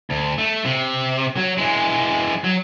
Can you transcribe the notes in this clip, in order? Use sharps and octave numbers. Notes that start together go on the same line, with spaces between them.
D2
A3
C3
F#3
E3 G#3
F#3